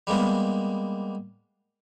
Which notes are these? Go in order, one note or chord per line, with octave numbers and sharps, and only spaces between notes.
G3 G#3 A#3 B3